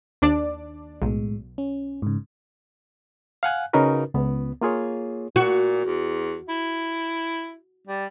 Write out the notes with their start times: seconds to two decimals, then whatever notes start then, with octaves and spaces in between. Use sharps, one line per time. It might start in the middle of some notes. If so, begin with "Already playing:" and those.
0.22 D#2 D4 D5
1.02 B1 A2 G#3
1.58 C#4
2.02 G#2 C#3
3.43 F5 F#5 G#5 F#6
3.73 C#3 C#4 D#4 F#4 A#4 B4
4.14 C#2 B3
4.61 A#3 F4 G#4 C#5
5.36 A#2 F#4
5.85 E2
6.49 E4
7.87 G3